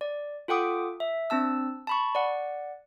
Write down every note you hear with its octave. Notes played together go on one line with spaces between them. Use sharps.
D5
F4 A4 F#5 G5 D6 D#6
E5
C4 D4 A5 E6
A5 B5 C#6
D5 F#5